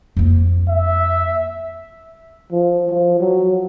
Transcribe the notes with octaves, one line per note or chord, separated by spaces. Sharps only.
F2 A#3
E5
F3
F3
F#3